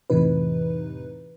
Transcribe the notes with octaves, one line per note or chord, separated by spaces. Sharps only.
F2 A2 C3 E3 D#4 B4